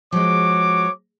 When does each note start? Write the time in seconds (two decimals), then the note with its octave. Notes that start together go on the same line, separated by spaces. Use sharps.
0.12 F3 G#3 F#4 C#5 D6